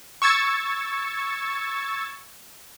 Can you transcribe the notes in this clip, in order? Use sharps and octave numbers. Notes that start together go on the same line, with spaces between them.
C#6 E6 G#6 A6 C#7